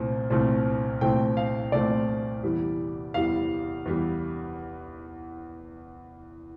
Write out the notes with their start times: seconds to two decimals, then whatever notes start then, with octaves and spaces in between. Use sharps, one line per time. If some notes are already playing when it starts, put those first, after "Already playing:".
Already playing: C2 A#2 A3 C4
0.30 C2 A#2 A3 C4
1.01 C2 A#2 A3 C4 G5
1.37 F5
1.72 C2 A#2 A3 C4 D5
2.43 E2 E3 G3
3.14 E2 E3 G3 F5
3.85 E2 E3 G3